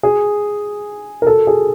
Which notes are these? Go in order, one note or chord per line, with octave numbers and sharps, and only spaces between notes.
G#4
A#4
A4
G#4